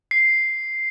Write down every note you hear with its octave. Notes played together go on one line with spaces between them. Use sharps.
C7